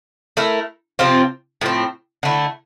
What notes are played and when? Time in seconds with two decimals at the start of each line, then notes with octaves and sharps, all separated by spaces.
0.37 A3 E4 A#4
0.99 C3 F3 C4 F4
1.61 A2 F3 C4
2.23 D3 A3 E4